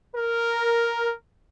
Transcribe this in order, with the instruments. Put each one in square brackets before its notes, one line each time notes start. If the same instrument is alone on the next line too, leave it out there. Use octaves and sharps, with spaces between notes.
[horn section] A#4